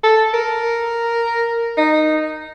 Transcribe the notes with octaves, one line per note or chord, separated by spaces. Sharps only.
A4
A#4
D#4